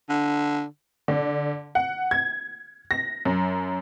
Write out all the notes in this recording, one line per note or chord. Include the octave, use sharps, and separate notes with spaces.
D3
D3
F#5
G#6
A#6
F#2